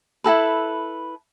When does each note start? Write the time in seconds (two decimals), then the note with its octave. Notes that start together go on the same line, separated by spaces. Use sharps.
0.24 E4 F#4 A4 B4